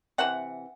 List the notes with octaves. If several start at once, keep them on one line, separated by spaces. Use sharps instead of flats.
C3 E3 F#5